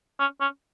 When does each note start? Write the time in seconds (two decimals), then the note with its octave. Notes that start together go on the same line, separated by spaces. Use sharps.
0.20 C#4
0.41 C#4